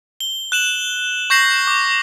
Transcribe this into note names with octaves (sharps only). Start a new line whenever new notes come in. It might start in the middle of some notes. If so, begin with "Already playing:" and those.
G7
F#6 E7 F#7
C#6 G6 A#6 C7 F#7
D6